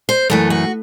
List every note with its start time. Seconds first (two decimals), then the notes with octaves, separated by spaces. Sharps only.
0.09 C5
0.30 F#2 E3 A3 A4
0.50 F#4